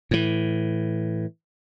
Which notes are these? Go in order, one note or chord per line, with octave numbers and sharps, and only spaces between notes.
A2 E3